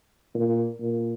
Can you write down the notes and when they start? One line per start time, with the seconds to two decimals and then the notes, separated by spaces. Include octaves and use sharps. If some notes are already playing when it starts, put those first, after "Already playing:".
0.35 A#2
0.81 A#2